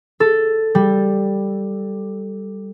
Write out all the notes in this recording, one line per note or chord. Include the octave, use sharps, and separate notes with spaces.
A4
G3